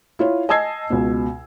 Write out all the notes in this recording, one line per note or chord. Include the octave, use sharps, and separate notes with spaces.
E4 F4 C#5
D#5 G#5 A5 E6 G#6 C7
C#2 B2